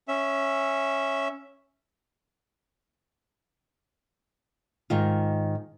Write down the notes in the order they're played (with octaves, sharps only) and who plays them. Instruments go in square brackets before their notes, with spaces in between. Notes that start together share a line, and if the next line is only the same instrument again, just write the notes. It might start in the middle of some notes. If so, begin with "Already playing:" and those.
[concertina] C#4 E5
[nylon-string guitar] G#2 D#3 F4